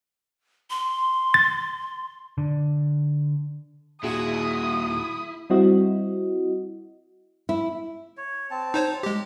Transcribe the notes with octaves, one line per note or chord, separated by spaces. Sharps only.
C6
A6
D3
D#2 A#2 E4 F#4 G#4 D#6
G3 C4 E4 F#4 D#5
E4
C#5
C4 A5
D#4 C5 C#5
G#3 G4